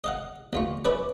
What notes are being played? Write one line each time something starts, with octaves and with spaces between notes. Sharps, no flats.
D#5 F5 F#5
D2 F4 C#6
C#4 B4 D5 E5 B5 D6